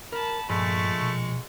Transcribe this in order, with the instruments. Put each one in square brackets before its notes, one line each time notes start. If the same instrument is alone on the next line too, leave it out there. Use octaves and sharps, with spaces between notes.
[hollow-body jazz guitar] A#4 [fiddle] A5 B5
[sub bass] G2 [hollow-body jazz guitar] A#2 F3 B5 [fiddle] G#3 C#6 [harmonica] A3
[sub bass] B2